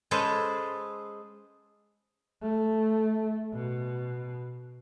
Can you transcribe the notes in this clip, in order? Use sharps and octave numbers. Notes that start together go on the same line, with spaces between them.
G#3 C#4 G#4 A4 B4 C5
A3
B2